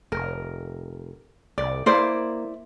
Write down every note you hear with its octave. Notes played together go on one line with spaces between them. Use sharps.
F1 A#4
C2 D5
A#3 E4 C5 D5